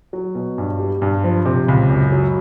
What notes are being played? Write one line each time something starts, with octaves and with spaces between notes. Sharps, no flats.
F#3
B2
G2
G3
G2
F3
C3
C#2
F#2
F#3